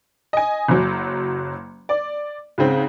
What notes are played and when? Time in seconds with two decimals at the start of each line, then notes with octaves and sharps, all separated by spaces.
0.33 D#5 G#5
0.68 F#1 F#3
1.89 D5
2.58 G#2 C#3 C4